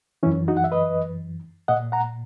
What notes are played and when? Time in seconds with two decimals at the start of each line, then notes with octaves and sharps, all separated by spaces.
0.23 E3 C#4 E4
0.26 F#2
0.48 D#4 F#4
0.57 F#5
0.64 E5
0.72 B4 D#5
1.68 A#2 D#5 F#5
1.92 F#5 A#5